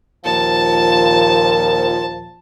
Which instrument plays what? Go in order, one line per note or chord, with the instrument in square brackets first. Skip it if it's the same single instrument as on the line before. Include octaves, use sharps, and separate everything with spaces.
[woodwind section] D#2 A#2 F3 [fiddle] A5